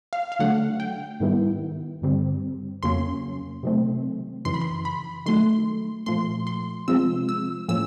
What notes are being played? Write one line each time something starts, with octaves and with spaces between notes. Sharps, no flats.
F5
F5
D3 F#3 A3 D4 F#5
G5
G#2 D#3 G3 B3 E4
G2 D3 G3 C4
F2 C#3 F#3 A#3 C#4 C6
C3 D#3 F#3 A3 C4
F#2 C#3 E3 C6
B5
C6
B5
D#3 F#3 A3 C6
A#2 F3 A3 C6
C6
C3 F3 G#3 C4 F4 E6
E6
A2 F3 A#3 C#4 E6